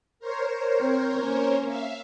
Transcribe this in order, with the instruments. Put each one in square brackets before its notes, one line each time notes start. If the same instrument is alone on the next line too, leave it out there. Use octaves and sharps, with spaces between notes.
[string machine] A#4 C5 C#5
[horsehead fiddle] C4
A#3 C#4
[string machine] E5 F5